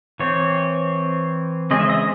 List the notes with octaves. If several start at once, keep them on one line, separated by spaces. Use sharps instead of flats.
E3 C4 C#5
C#3 G#3 C4 D#5
E5
D#5